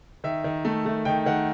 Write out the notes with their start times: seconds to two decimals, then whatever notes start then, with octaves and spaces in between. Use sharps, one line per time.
0.24 D#3 E5
0.44 D#3
0.65 A3
0.86 A3
1.05 D#3 G5
1.26 D#3 F#5